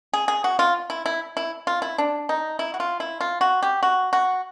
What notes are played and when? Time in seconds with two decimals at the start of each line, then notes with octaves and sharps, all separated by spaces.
0.13 G#4
0.28 G#4
0.44 F#4
0.59 F4
0.90 E4
1.06 E4
1.37 E4
1.67 F4
1.82 E4
1.98 D4
2.29 D#4
2.59 E4
2.74 F#4
2.80 F4
3.00 E4
3.21 F4
3.41 F#4
3.63 G4
3.83 F#4
4.13 F#4